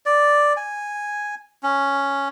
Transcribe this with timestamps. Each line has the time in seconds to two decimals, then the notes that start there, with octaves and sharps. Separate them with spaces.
0.06 D5
0.57 G#5
1.63 C#4